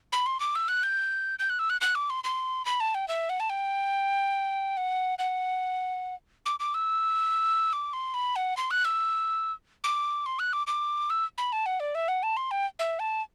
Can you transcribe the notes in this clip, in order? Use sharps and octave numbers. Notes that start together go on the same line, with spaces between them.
B5
C6
D6
E6
F#6
G6
G6
F#6
E6
F#6
F#6
D6
C6
C6
B5
A5
G5
E5
F#5
A5
G5
F#5
F#5
D6
D6
E6
D6
C6
B5
F#5
C6
F#6
E6
D6
C6
F#6
D6
D6
E6
B5
A5
F#5
D5
E5
F#5
A5
C6
G5
E5
A5